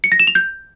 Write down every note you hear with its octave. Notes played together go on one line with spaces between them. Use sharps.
C#7
A#6
E7
F7
G6